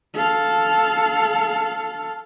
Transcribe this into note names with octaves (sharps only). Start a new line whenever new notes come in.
A4 F5